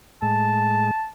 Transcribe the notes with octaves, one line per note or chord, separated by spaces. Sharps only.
A2 G#3 A5